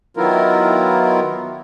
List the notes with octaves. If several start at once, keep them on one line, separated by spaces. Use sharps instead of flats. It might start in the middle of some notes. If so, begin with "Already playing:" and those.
D#3 F#3 B3 E4 F4 A#4